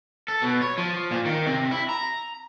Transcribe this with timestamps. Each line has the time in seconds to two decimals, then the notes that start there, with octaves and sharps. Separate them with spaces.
0.28 A4
0.42 B2
0.61 C#5
0.78 F3
1.11 A#2
1.25 D#3
1.46 C3
1.71 E4
1.89 A#5